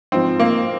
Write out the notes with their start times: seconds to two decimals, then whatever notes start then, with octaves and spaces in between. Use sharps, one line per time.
0.12 G#2 F3 C4
0.40 A#3